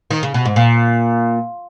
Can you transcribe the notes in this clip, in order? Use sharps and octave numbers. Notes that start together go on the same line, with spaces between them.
D#3
C#3
B2
G#2
A#2